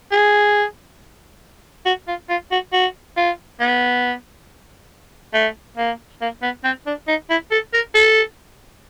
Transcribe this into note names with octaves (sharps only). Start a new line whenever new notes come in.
G#4
F#4
F4
F4
F#4
F#4
F4
B3
A3
A#3
A#3
B3
C4
D4
D#4
E4
A4
A#4
A4